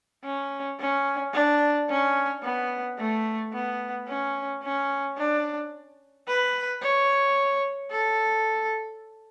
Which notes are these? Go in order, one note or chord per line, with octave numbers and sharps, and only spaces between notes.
C#4
C#4
D4
C#4
B3
A3
B3
C#4
C#4
D4
B4
C#5
A4